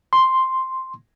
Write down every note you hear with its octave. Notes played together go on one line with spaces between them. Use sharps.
C6